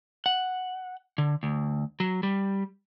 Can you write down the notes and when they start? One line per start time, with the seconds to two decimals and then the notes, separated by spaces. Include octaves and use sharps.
0.26 F#5
1.18 D3
1.43 D2
2.00 F#3
2.23 G3